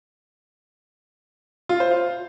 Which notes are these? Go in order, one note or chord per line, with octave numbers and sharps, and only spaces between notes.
F4
C5
F5